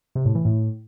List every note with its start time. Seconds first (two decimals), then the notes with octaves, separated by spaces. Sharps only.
0.15 C3
0.25 A2
0.35 E3
0.45 A2